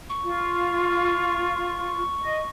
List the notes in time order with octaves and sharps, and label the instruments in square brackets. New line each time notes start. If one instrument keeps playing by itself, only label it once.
[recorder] C#6
[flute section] F4
D#5